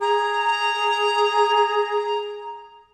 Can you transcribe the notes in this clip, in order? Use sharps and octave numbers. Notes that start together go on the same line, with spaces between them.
G#4 A#5